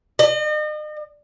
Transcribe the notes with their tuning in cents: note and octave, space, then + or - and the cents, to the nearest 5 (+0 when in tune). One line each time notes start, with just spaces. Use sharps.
D#5 -40